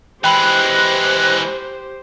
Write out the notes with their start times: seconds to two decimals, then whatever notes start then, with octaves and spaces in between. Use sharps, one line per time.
0.24 E3 G#3 G4 C5 G5 B5 F#6